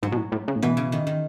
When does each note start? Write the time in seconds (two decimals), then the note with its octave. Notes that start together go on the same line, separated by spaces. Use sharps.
0.03 G#2 F#3
0.12 B2
0.17 A2
0.32 A2
0.48 C#3
0.56 A2
0.62 B2 E3
0.77 C#3
0.92 D#3
1.07 D#3